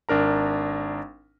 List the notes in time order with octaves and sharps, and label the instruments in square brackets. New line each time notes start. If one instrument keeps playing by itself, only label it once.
[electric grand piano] G#1 D4 A#4 A#5